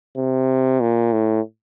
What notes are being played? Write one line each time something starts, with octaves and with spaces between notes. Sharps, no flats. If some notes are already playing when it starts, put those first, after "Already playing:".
C3
A#2
A2